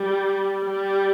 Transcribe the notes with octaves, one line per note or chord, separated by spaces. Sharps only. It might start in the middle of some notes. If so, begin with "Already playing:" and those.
Already playing: G3
G3